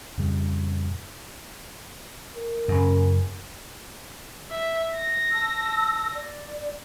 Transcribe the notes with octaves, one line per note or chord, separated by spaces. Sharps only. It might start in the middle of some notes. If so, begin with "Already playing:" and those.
F2 A#2 C#3 G3
A#4
F#2 C#3
E5
A#6
A5 E6
D5